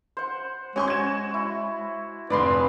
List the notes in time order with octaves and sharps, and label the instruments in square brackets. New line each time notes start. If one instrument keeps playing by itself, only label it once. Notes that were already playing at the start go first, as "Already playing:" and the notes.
[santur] C5 F#5
[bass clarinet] G#3 [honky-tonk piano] C#4 C6 C#6 [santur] F#4 G#5
[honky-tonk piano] G#6 E7
[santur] E4
[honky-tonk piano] F1 G#2 [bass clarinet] B4 [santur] D5 B5 C6